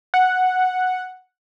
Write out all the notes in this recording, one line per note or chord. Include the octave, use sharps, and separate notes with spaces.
F#5